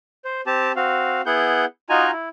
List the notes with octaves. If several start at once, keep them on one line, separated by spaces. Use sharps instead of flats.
C5
C4 G4 A5
C4 F#4 F5
B3 E4 G#4 F#5 G6
D#4 F4 F#4 D#5 G#5 A#5
E4